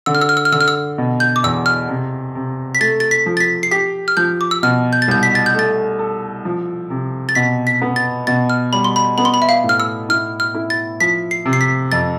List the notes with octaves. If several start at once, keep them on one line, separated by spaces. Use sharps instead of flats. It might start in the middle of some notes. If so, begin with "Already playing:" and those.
D3 E6
F6
E6
F6
E6
F6
D3 E6
F6
E6
B2
G6
D6
E2 E6
F6
C3
C3
B6
A3 A6
A6
B6
F3
A6
B6
C7
G4 B6
F6
F3 G6
D6
E6
B2 F6
G6
A6
C2 G6
B6
A6
G6
A3
A6
A4
F3
C3
A6
B2 B6
B6
B3
A6
B2 A6
F6
G3 B5
C6
B5
B3 B5
C6
B5
E5
F5
A2
F6
E6
E4 F6
F6
E4
A6
F3 B6
C7
C3
C7
B6
F2 A6